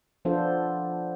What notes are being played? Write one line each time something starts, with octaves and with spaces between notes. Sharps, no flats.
F3 B3 D4 F4 A4 C5